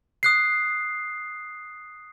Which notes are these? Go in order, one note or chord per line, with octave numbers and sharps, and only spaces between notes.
D#6 F#6 C7